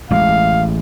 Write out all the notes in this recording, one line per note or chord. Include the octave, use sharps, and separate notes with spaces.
A1 G#3 F5